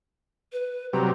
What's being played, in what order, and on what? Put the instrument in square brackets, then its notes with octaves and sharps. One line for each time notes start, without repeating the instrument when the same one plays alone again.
[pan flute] B4
[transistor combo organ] C3 F#3 G3 [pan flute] A#5